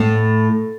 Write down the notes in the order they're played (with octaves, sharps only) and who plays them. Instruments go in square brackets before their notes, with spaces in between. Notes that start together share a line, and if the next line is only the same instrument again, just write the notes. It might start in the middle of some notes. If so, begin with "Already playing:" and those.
Already playing: [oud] A2